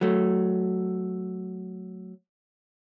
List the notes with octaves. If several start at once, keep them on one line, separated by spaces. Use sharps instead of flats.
F#3 A3